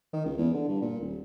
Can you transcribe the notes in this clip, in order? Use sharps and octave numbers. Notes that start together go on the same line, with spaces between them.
D#3
C#2
E2
D3
G2
A#2
D#1